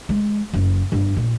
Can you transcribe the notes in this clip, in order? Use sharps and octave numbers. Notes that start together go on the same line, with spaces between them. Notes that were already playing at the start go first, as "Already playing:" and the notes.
G#3
F#1
G1
A#2